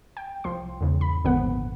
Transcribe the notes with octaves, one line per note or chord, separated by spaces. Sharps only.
G5
C2 F3 C6
E2 G#2 C#3
B5
G#1 A#2 D3 F3 B3 F#5